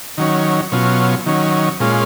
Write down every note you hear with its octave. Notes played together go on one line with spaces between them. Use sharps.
D#3 F#3 C#4
B2 F#3 C#4 F4
D#3 F#3 C#4
A#2 G#3 C#4 F4